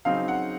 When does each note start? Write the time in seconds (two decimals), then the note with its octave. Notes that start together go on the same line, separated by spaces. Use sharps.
0.05 C#3 F#3 C4 D#4 F5
0.28 F#5